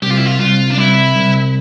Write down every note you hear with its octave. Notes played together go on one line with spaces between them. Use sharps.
C2 G4
F4
E4
F4
C2 F4
D4
C2 E4
C2